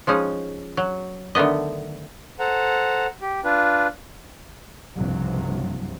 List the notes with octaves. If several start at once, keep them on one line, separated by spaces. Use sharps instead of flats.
F3 G#3 C#4 D#4
F#3
D3 D#3 A3 B3 D#5
A4 C5 F#5 A#5
G4
D4 F4 B4
F#1 C2 G2 C3 F3 F#3